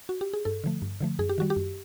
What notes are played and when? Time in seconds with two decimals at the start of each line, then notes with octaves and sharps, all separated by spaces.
0.09 F#4
0.21 G4
0.33 G#4
0.45 G2 A4
0.64 D3 F3 A3
0.82 G2
1.01 D3 F3 A3
1.19 F#2 G#4
1.29 G4
1.38 D#3 G3 F#4
1.50 G4
1.56 F#2